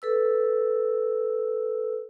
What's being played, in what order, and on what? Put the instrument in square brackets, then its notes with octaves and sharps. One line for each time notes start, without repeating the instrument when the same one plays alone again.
[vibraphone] A4 B4 E6